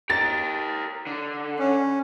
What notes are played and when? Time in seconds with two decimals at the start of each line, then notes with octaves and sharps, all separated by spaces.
0.10 G4 A#4 A6
1.07 D3
1.59 C#4